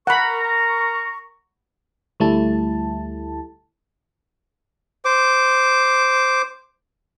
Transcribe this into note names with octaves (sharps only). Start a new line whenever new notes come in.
A#4 F#5 A#5 B5 C#6
D2 G3 A3 E4 A5
C5 D6